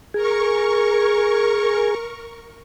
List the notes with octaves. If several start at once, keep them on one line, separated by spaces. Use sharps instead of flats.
G#4 A#4 C#6